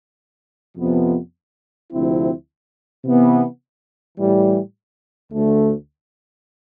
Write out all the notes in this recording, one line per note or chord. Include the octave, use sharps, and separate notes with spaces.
F2 C3 F3 B3
D2 C3 F3 C4 E4
C3 E3 B3
A2 E3 G3
D2 D3 A3